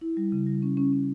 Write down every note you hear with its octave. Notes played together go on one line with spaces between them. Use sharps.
E4
G3
C#3
G3
C#4
C#4
C#4